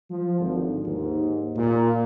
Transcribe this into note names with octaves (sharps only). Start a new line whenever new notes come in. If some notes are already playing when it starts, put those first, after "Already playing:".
F3
G#1 D2
D#2 G#2
A#2